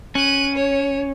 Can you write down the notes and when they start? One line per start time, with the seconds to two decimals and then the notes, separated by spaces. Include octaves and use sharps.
0.15 C#4 F#6 D#7
0.55 C#5